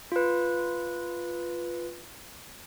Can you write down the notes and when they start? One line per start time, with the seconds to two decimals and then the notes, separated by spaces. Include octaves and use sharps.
0.12 F4 B4